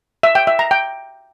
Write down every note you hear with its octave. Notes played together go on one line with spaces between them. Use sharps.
E5
G5
E5
A#5
G5